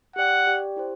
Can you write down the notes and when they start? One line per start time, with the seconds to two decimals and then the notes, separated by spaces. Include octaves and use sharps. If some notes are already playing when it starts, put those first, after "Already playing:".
0.16 G4 D5 F#5 G5
0.47 G4 D5 G5
0.76 E4 G4 C5